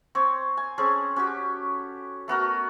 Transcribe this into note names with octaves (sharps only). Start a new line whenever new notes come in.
C4 C#5
G#5
C4 C#4 G#4 A4
C#4 F#4 G4
A3 B3 F#4 A#4